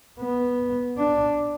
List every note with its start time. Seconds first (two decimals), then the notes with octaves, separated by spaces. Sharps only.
0.20 B3
0.97 D4